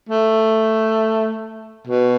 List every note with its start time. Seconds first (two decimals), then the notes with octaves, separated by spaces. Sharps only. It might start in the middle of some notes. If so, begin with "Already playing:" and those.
0.09 A3
1.87 B2